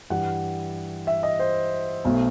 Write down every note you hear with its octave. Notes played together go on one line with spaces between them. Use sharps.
G2 E3 G3 F#5
E5
D#5
C5
B1 B2 A3